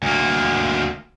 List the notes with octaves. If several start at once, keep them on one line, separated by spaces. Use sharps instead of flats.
D2 A#3